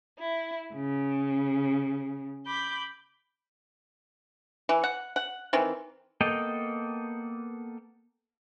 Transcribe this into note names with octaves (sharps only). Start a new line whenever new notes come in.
E4
C#3
B5 D6 G6
E3
F#5
F#5
D#3 E3 C4
A#3 B3 A4 D#5 G5